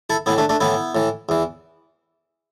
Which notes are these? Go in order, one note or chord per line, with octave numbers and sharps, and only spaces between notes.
E4 A4
A2 E3 B3 E4
A3 D4
A3 D4
A2 E3 B3 E4
A2 E3
E2 E3